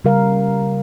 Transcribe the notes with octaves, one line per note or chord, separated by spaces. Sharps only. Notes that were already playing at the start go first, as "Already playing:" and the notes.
C#3 G3 A#4 F5